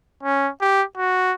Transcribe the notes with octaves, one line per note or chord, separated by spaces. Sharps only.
C#4
G4
F#4